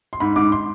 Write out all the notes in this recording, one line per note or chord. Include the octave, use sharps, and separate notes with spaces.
C6
G#2 B5
G#2 D6
C6